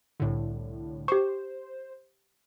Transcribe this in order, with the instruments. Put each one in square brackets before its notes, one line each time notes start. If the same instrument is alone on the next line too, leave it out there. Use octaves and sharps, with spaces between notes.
[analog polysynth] C2 A2 D3
[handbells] G4 C#6 [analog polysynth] C5